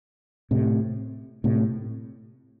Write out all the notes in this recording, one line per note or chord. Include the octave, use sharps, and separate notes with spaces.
A2 C3
A2 C3